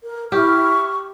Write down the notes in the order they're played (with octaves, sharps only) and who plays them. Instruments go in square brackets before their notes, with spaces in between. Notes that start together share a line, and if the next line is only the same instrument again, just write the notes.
[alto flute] A#4
[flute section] E4 F6 [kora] G4 [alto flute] C#6